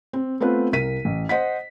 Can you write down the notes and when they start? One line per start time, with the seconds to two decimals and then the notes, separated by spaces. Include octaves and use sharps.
0.13 C4
0.40 A3 B3 C4 F4 B4
0.72 C2 A#4 B6 D#7
1.05 A1
1.29 C5 D#5 F#5 B6